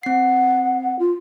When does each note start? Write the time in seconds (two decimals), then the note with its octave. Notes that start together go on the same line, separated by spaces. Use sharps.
0.03 C4 F#5 C7
0.99 F4